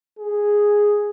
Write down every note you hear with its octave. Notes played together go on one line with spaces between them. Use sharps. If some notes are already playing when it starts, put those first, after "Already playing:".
G#4